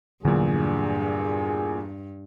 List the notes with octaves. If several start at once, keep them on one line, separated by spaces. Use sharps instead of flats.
E2 G2 A#2 D3 F#3 G#4